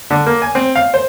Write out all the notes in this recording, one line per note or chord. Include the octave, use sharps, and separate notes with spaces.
D3
A#3
G#5
C4
F5
C5